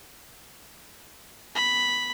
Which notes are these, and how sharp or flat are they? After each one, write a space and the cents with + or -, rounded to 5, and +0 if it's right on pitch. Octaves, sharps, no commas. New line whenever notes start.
B3 +0 B5 +0